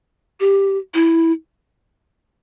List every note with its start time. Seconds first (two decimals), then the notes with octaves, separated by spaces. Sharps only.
0.40 G4
0.94 E4